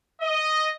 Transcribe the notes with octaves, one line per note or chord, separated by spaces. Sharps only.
D#5